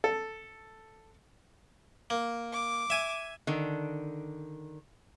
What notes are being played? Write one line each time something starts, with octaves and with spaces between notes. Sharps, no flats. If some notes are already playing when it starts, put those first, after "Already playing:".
A4
A#3
D6
E5 G#5
D3 D#3